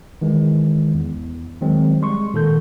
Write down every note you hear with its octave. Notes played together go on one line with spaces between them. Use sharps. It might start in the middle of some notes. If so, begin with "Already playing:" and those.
D#3 E3 G#3
E2
D#3 F#3 G#3 C4
G3 G#3 C6 C#6
A#2 D#3 A4 G6